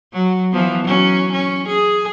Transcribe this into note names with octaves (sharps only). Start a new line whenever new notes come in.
F#3
E3 F3 B3
F#3 C#4
C#4
G#4